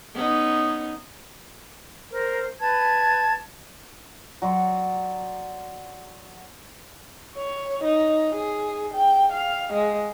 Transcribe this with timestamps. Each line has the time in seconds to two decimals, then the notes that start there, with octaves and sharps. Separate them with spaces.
0.14 B3 C#4 D#4
2.12 A#4 C5
2.59 B4 A5 G#6
4.42 F#3 D5 C6 C#6
7.36 C#5
7.84 D#4
8.35 G#4
8.94 G5
9.33 F5
9.73 G#3